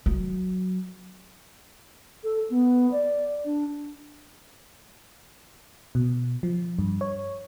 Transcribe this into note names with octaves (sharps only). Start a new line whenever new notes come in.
F#3
A4
B3
D5
D4
B2
F3
G2
C#5